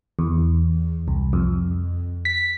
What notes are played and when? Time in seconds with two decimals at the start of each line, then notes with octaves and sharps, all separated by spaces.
0.19 E2
1.08 C2
1.33 F2
2.25 B6